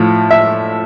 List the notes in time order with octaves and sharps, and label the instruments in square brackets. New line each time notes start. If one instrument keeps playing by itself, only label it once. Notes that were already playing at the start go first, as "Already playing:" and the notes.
Already playing: [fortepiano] A2 F3
E5